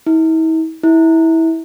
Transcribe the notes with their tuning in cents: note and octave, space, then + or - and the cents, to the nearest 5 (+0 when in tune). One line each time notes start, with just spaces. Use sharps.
E4 -45
E4 -20